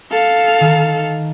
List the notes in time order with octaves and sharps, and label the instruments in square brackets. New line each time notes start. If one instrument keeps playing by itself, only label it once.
[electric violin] A4 F5
[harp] D#3